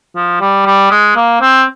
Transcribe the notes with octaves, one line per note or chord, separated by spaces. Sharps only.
F3
G3
G3
G#3
A#3
C4